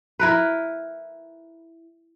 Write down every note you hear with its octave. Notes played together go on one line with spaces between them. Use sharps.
E4 A#4 B4